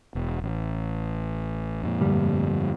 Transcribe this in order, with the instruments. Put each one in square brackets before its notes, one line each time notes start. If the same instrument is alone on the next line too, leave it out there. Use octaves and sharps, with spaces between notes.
[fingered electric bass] E1
A1
F2 A#2
[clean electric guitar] D2 G2 G3